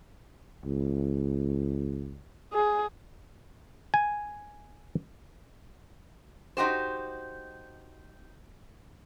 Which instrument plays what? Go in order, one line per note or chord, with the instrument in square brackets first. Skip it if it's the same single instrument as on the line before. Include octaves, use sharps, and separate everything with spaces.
[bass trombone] C#2
[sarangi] G#4
[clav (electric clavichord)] G#5
[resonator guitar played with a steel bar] D#4 F#4 G4 C5